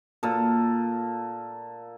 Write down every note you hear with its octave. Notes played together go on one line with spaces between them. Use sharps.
A#2 A4